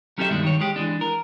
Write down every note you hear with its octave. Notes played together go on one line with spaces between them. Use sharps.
F#3 C#4 G4 A4 C5 E5
G2 B2 D#3 G3 G#3
D#3 C#5
G#3 G4
E3 G#3 D4
A#4